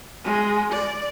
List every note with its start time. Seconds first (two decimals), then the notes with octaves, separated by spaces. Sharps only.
0.24 G#3
0.72 D5